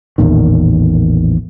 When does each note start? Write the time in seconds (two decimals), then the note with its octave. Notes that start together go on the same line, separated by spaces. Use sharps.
0.18 A1 E2 A#2 D#3